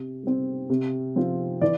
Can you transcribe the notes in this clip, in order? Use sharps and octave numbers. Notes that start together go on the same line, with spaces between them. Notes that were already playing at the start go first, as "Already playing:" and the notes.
Already playing: C3
G3 C4
C3
F3 C4 F4
E3 D5